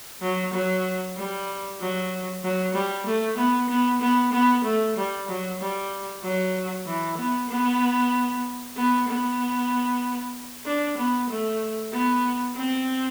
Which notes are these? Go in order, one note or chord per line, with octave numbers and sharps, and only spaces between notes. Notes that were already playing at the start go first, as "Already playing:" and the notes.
F#3
F#3
G3
F#3
F#3
G3
A3
B3
B3
B3
B3
A3
G3
F#3
G3
F#3
E3
B3
B3
B3
B3
D4
B3
A3
B3
C4